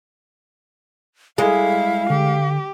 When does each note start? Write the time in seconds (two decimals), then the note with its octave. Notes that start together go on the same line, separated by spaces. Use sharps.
1.38 G3 G#3 E4 F5
2.10 D3 G4